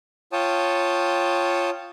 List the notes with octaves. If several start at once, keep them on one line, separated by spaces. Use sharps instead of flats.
F4 C#5 G5 A5 D#6